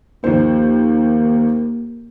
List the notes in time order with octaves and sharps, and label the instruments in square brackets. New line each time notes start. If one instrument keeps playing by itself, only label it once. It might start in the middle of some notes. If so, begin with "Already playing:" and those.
[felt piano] D#2 F3 C5 [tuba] A#3